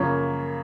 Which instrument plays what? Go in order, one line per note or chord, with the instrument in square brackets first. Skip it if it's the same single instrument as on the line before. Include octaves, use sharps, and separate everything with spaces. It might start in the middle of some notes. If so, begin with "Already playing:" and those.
Already playing: [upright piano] F#2 C#3 F3 A#3 C#5